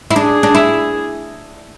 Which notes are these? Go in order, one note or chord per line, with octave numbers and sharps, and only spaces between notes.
E4
D4 G#4
D4
E4